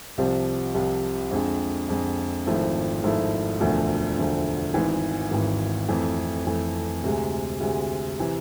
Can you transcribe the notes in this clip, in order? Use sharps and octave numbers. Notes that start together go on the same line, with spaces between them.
C2 C3 F3
C2 C3 F3
F2 D3 G#3
F2 D3 G#3
G#1 G#2 F3 A3 E4
G#1 G#2 F3 A3 E4
E1 D2 D3 F3 A3
E1 D2 D3 F3 A3
G#1 G#2 E3
G#1 G#2 E3
F2 E3 A3
F2 E3 A3
D2 C3 G#3
D2 C3 G#3
C3 E3